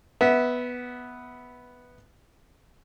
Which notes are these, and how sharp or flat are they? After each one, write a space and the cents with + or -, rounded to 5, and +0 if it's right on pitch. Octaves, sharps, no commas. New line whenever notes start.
B3 +0 E5 -20